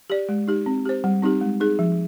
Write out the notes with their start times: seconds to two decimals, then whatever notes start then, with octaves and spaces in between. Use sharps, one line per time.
0.10 G4 D5
0.29 G#3
0.48 D#4 G4
0.66 C4
0.85 G4 C5
1.04 G3
1.23 C4 D#4 G4
1.41 G#3
1.61 D#4 G#4
1.79 F3